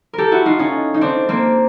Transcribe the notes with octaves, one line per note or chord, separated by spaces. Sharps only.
G4 A4 A#4
E4 F#4
D#4 F4
C#4 D#4
D#4
C4 D4
A#3 C4